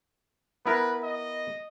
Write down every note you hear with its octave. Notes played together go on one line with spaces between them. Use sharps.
B3 E4 A#4 B4
D#5